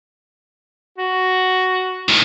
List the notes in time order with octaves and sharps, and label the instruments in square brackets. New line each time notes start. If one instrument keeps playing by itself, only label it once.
[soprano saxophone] F#4
[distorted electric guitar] A2 D#3